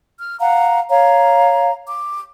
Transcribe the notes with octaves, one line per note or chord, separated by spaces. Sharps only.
F6
F5 F#5 A#5
C#5 F5 A#5
D6